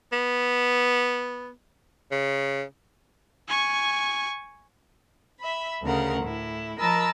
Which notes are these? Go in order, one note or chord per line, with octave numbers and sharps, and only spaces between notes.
B3
C#3
G#5 C#6
E5 B5
D2 C#3 A#4 F#5
A2 E4
F3 A#4 D#5 A5 B5 E6